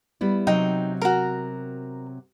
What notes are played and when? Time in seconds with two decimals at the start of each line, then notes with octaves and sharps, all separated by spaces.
0.21 G3 B3 E4
0.47 C3 F#3 D#4 G5
1.02 F#4 A#4